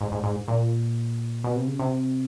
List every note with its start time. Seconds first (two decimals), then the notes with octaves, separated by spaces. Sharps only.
0.01 G#2
0.12 G#2
0.24 G#2
0.48 A#2
1.44 B2
1.56 C3
1.67 C#3
1.79 C3